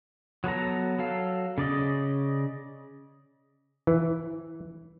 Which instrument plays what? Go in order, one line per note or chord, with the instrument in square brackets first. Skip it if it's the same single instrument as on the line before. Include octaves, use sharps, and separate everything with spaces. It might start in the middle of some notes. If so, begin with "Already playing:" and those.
[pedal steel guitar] F#3 B3 A4 A#5
F#3 A4 F5
C#3 D5 D#5
[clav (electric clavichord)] E3